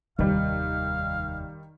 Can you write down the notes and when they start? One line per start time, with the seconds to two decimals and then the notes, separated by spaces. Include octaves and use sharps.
0.19 F1 D#2 D#3 G3 F5